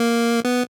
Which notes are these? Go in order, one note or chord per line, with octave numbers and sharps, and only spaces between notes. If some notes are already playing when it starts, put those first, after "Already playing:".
Already playing: A#3
B3